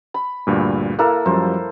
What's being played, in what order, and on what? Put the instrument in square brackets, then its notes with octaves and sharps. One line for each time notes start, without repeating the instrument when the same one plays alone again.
[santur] B5
[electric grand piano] D2 G2 A#2
[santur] A#3 E4 A4 [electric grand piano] F5 F#6
[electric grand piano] F#2 F3 G3 [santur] C5